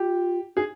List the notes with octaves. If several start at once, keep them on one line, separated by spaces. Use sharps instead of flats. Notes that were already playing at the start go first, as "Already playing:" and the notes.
Already playing: F4 G4
D#4 G#4